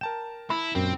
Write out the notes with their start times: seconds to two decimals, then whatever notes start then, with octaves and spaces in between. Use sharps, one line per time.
0.01 A#4 G5 A5 E7
0.50 E4 B5
0.75 F#2 A#2 C4